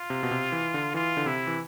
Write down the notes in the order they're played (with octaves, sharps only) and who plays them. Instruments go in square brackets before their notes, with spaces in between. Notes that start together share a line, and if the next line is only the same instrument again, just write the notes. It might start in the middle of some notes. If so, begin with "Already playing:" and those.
Already playing: [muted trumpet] F4
[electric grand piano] C3
B2
C3
E3
D3
[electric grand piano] E3 [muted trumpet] F4
[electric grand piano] D3
[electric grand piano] C3 [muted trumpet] E4
[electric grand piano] E3